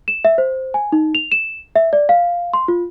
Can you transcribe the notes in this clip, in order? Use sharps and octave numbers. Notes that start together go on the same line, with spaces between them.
E7
E5
C5
G#5
D#4
F7
E7
E5
D5
F5
C6
F4